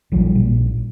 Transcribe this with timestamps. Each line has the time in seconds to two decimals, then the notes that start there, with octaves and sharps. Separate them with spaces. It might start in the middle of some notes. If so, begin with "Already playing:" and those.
0.12 A#1 F3 G3
0.35 A#2